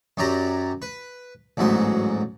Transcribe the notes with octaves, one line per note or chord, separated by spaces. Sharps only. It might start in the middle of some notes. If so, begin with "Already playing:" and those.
F#2 F#3 G4 D5 A#5
B4
A1 D2 G#2 F#3 B3 C6